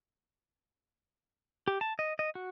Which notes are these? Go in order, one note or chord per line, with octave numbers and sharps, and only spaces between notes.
G4
A5
D#5
D#5
F#4